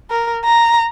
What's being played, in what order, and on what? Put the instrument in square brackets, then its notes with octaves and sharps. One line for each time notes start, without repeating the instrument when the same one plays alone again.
[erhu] A#4
A#5